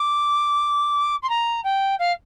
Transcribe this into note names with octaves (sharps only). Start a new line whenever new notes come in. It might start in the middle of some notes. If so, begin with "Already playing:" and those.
Already playing: D6
C6
A#5
G5
F5